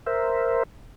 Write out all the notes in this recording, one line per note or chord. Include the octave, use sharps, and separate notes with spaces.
A#4 C5 E5